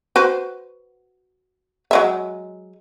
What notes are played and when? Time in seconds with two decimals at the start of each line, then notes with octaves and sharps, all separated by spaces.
0.16 F#4 B4 C5
1.91 F#3 G#3 E5